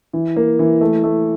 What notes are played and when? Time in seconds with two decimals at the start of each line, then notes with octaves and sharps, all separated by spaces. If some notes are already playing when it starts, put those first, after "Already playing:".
0.13 E3
0.36 A#3
0.59 E3
0.81 A3
1.04 A3